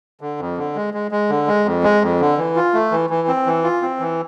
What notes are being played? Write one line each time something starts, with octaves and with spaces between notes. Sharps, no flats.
D3
F2
D3
G#3
G#3
G#3
D3
G#3
F2
G#3
F2
D3
E3
F4
A3
E3
E3
C4
E3
F4
C4
E3